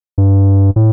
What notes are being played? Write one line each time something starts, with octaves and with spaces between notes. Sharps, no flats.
G2
A2